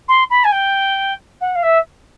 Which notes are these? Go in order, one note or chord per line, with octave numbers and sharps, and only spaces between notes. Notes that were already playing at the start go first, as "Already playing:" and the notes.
C6
B5
G#5
G5
F#5
F5
E5